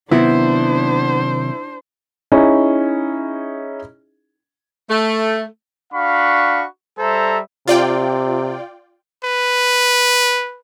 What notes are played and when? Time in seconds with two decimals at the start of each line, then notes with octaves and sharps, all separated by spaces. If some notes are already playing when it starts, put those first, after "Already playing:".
0.11 C3 D#3 F#3 B3 D4 E4 C5
2.32 C#4 D#4 E4 G#4
4.90 A3
5.93 D4 F#4 F5 B5 C#6
6.98 G3 A4 C5 E5 A#5
7.68 C3 F4 D5 G5
9.24 B4